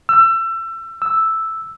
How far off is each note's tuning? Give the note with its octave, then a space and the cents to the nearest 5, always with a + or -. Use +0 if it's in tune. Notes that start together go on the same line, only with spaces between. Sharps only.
E6 +30
E6 +0